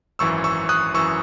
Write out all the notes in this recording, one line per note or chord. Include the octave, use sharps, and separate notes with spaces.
G#1 F#2 E3 C#6 E6
C#6 E6
D#6 F#6
F#2 E3 C#6 E6